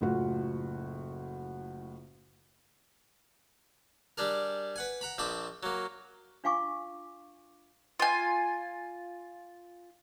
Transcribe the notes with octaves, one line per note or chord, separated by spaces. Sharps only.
F#1 A2 F4 F#4
G3 D4 G#4 A#4
B4 F#5 G#5
F#5 A#5 B5
A#1 C4 D#5 A5 B5 D6
F#3 A#3
D4 F4 F5 G#5 C#6 D6
F4 G#5